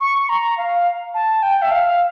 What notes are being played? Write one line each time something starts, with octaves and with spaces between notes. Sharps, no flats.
C#6
C#6
A#5
F5
A5
G5
E5
F5